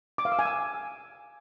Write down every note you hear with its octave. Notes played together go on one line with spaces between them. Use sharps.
D6
F5
E6
G#5
E6